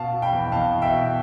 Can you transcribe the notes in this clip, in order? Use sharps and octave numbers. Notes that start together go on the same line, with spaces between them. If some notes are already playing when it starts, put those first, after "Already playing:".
Already playing: B2 F5 A5
B2
G5 B5
E2
E2 F5 A5
B2
E5 G5
B2